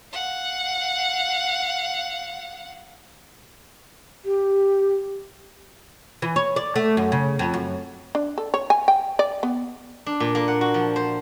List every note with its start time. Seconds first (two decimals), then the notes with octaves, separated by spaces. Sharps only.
0.13 F5 F#5
4.25 G4
6.22 E3
6.36 C#5
6.56 D5
6.76 A3
6.97 F#2
7.12 C#3
7.39 F2
7.54 F#2
8.15 D4
8.38 A4
8.54 C#5
8.70 G#5
8.88 G5
9.19 D5
9.43 B3
10.06 D4
10.20 A#2
10.35 A#3
10.48 F#5
10.61 F#4
10.74 F3
10.96 C5